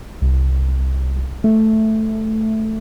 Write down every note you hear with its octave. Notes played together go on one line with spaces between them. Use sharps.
C2
A3